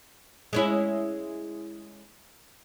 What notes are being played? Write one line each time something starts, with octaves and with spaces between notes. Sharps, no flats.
G#3 C#4 E4